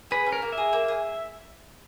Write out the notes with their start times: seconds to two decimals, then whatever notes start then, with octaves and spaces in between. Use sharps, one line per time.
0.11 G#4 B4
0.26 C#4
0.32 A#4
0.42 A#3
0.52 E5
0.58 G#4
0.73 A#3
0.88 G#4